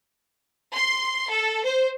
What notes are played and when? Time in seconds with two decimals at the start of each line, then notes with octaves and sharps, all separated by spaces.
0.74 C6
1.30 A4
1.64 C5